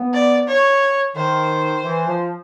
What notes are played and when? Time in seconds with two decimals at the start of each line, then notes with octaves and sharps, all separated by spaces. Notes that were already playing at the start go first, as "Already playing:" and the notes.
Already playing: B3
0.14 D5
0.48 C#5
1.16 D#3 C5
1.84 E3
2.07 F3